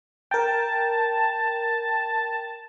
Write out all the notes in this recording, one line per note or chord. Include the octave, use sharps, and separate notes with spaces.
A#4 G5 A5